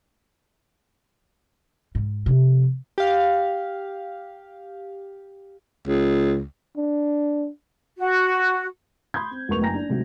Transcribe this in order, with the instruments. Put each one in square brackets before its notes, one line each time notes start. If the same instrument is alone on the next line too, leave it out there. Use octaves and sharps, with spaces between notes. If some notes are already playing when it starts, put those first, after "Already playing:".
[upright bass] G#2
C3 F3
[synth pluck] G4 F5
[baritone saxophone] C#2
[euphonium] D4
[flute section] F#4
[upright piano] B5 C6 D#6 G6 G#6
C4
E1 D2 A#4 B4 C#6 F7
F#1 G5 G#5 A#5 A#6
D4
G#2 C3 F#3 A3